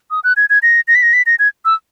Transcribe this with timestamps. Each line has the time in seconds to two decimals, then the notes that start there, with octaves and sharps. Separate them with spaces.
0.11 D#6
0.24 F#6
0.37 G#6
0.50 G#6
0.63 A#6
0.88 A#6
0.95 B6
1.03 A#6
1.13 B6
1.26 A#6
1.39 G#6
1.65 E6